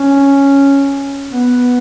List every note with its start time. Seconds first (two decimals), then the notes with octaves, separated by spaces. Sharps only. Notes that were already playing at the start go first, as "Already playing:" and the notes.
Already playing: C#4
1.31 B3